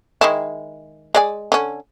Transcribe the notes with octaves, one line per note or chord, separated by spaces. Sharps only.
D#3 G#3 E4
G#3 D5 G#5
D3 C#4